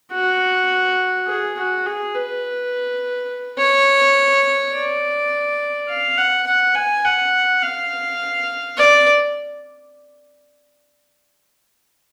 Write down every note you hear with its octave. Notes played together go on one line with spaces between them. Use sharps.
F#4
G#4
F#4
G#4
B4
C#5
D5
F5
F#5
F#5
G#5
F#5
F5
D5